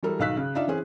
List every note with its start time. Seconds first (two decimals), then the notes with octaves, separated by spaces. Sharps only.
0.03 E3 F#3 G3 A4 A#4
0.19 B1 D#3 F5 E6 F#6 B6
0.37 C#3
0.55 D4 D#4 F4 D5 E5 F5
0.68 E3 C4 C#4 G#4